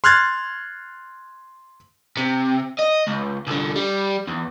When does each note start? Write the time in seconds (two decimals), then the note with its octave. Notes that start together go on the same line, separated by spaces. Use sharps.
0.04 C6 F6 F#6 G#6 A6
2.17 C3
2.79 D#5
3.07 C#2
3.47 C2 D3
3.76 G3
4.27 E2